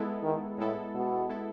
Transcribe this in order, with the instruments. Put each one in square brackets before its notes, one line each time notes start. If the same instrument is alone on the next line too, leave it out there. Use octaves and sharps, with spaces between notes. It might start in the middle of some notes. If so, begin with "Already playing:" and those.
Already playing: [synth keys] G#3 B3 E4 A4
[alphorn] D#3
[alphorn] A2 [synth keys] G#3 B3 E4 A4
[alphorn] B2
[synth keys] G#3 B3 E4 A4